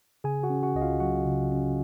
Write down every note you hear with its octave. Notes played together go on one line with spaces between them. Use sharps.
C#3 G#4 G#5
F#4 F#5
C#4
F#4 F#5
C#2 D#5
F4 F5
F#3 F#4 F#5
C#3
C#4